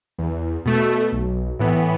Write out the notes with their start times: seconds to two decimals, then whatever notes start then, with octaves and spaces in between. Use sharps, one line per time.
0.19 E2
0.65 B2 A3
1.12 B1
1.59 A2 E3 B3